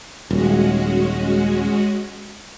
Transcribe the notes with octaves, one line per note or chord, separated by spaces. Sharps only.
D#1 G#3 C#4 F#4